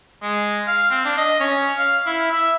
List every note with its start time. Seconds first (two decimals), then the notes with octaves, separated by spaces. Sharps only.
0.23 G#3
0.67 F5
0.91 C4
1.05 D4
1.17 D#5
1.40 C#4
1.78 F5
2.06 E4
2.31 E5